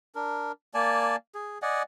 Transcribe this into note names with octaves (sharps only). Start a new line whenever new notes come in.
D4 A#4
A#3 D5 G#5 A5
G#4
D5 D#5 F#5 G#5